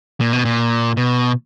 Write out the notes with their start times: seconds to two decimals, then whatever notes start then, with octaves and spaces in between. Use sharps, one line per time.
0.21 A#2
0.33 B2
0.45 A#2
0.97 B2